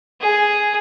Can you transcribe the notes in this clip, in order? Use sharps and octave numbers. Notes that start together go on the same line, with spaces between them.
G#4